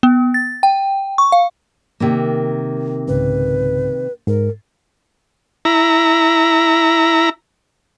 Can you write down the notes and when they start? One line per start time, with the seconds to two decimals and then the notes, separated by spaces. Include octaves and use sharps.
0.03 B3
0.34 A6
0.63 G5
1.18 C#6
1.32 F5
2.00 C3 D#3 A#3
3.08 C2 G#2 C#3 B4
4.28 G#2 A#4
5.65 E4 A#5